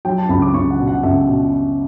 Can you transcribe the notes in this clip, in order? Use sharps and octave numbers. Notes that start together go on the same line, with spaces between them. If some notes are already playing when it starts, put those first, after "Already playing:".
F#3 G5
A5
C#2 B5
D6
C#2 C#6
F#5
B2
F#5
C#2 E5
B2